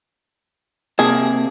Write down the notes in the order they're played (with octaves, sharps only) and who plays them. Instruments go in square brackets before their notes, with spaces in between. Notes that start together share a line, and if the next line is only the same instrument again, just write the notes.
[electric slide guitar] C3 A#3 A5 [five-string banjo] G#4